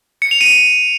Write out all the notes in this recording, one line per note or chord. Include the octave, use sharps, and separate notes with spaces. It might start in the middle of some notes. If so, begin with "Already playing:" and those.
C#7
F7
D#7